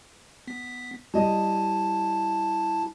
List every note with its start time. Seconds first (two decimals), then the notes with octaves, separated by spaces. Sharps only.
0.47 B3 B6
1.14 G3 E4 D#5 A5